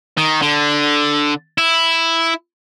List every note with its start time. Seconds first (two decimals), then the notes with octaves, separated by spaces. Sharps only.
0.17 D#3
0.42 D3
1.58 E4